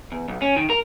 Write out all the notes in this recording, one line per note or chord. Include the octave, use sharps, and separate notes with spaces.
E2
B1
C#4
D#3
A#4